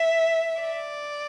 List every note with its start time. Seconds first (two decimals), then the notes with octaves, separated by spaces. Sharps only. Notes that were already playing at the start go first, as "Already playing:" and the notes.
Already playing: E5
0.62 D5